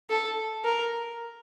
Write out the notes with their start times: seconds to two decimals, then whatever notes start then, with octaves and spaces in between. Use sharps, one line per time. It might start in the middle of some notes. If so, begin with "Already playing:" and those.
0.10 A4
0.65 A#4